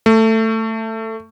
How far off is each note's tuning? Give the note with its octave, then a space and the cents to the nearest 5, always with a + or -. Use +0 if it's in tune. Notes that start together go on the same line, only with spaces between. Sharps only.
A3 +15